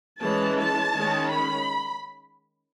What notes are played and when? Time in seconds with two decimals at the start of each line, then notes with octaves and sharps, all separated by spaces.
0.21 E3 G#3 C#4 A5
0.57 A5
0.92 D#3 G#3 C#4
1.27 B5